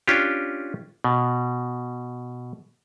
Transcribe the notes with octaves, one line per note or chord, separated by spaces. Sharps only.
C#4 D4 F4 G4
B2